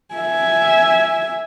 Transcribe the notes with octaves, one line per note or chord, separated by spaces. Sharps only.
E5 G#5